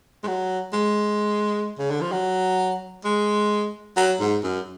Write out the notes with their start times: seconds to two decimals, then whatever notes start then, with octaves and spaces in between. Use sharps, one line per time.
0.23 G#3
0.27 F#3
0.73 G#3
1.79 C#3
1.91 D3
2.01 F3
2.12 F#3
3.05 G#3
3.97 F#3
4.20 G#2
4.44 F#2